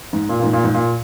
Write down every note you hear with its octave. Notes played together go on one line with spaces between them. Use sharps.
G#2
A#2
A#2
G#2
A#2
G#2
A#2